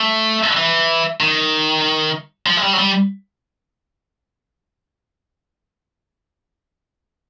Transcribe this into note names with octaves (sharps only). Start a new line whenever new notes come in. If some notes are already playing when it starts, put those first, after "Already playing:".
Already playing: A3
E3
D#3
F3
G#3
G3
F#3
G3